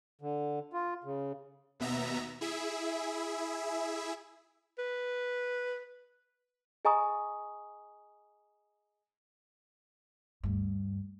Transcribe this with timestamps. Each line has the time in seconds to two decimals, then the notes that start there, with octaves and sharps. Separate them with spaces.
0.21 D3
0.73 F4
1.04 C#3
1.80 D#2 B2 B3 E5 A#5
2.41 E4 G#4 E5
4.79 B4
6.85 G#4 D#5 G#5 A#5 C#6 D#6
10.43 D2 G2